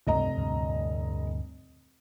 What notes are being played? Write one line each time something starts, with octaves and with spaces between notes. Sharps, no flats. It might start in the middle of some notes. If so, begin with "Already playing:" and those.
F1 C#2 G2 G3 D#5 A#5
D2 G2 A#2